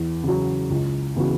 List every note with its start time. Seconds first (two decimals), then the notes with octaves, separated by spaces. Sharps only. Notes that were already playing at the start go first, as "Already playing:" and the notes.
Already playing: E2
0.23 C#3 F#3
0.70 C#2
1.16 C#3 E3 B3 F#4